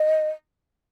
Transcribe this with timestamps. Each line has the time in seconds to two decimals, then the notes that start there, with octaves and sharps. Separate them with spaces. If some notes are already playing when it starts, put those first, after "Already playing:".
Already playing: D#5